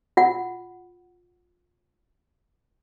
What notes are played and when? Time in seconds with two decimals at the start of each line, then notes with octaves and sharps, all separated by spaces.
0.17 F4 F#5